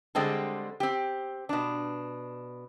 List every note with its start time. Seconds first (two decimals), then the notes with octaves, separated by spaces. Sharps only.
0.15 D3 G3 G#3 C4 G#4 A4
0.80 C4 G4
1.49 B2 D4